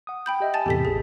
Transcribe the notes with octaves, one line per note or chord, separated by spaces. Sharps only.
F#5 D#6
G5 B5 G6
G4 D#5 E5
G#5 A5 A6
E2 A2 C3 G4 A4 B6
A1 G#4 A4